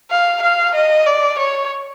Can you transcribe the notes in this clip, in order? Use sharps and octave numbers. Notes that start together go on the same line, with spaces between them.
F5
F5
D#5
D5
C#5